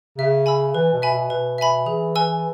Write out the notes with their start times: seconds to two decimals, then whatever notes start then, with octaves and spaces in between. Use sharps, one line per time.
0.18 C#3 E5
0.46 G#5 B5 E6
0.75 E3 B4
0.93 B2
1.02 E5 G#5 B5
1.12 B2
1.30 B2 B4
1.58 E5 G#5 B5
1.86 E3 G#4
2.16 B4 G#5 E6